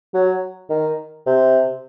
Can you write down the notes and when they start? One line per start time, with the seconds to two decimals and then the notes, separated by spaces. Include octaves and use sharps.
0.14 F#3
0.69 D#3
1.26 C3